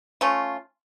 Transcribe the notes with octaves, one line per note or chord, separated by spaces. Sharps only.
A3 C#4 F4